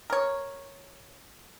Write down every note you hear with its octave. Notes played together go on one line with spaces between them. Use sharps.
A#4 C#5